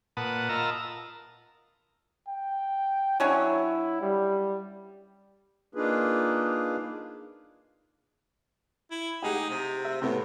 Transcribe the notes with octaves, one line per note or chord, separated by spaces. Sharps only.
A#2 B4 F#5 A5 D#6
F4 A#4 D#5 A5 A#5 E6
G5
F#3 C#4 D4 E4
G3
A#3 D4 D#4 F4 G#4 B4
E4
D#4 G4 G#4 F#5
C3
E5
A2 C3 B3